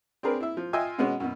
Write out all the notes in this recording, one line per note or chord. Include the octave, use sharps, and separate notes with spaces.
C4 D4 G#4 A#4 B4
E4 E5
F3
F4 D#5 E5 G5 G#5
B2 G#3 B3 C#4
F#2 B2